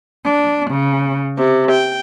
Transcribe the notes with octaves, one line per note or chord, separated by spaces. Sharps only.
D4
C#3
C3
G5